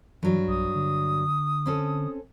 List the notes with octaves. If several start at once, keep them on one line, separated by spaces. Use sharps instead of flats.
G2 E3 F#3
B1 D#6
D3
C4 C#4 A4